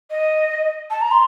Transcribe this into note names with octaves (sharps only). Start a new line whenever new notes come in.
D#5
A5
A#5
C6